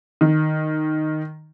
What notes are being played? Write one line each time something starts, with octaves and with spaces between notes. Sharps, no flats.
D#3